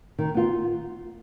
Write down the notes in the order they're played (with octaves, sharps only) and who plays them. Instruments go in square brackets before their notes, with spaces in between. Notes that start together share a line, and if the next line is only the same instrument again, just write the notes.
[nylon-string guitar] D#3
B3 F4